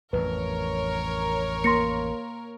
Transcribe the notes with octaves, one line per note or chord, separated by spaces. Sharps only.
A1 F2 A#4 B4 C#5
A#3 C6 A#6 C#7